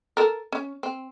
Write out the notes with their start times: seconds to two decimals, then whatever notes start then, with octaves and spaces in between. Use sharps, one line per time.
0.17 A4 A#4
0.52 C#4
0.83 C4